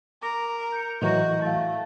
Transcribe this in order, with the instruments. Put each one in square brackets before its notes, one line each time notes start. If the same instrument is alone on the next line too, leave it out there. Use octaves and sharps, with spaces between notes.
[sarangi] A#4 [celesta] D6 A#6
[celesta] G6 C#7
[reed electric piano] A2 E3 F#3 [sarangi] F#4 [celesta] D#5 G6 A#6
[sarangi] A3 [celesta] F5 A6